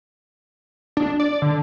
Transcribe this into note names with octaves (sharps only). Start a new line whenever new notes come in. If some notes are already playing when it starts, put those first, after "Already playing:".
D4
D5
D3